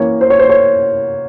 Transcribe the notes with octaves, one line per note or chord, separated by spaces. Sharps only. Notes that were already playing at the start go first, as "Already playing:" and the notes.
Already playing: E3 A#3 C#4 C#5
C5
C#5
C5
C#5